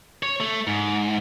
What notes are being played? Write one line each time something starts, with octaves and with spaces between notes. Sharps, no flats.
C#5
A3
G#2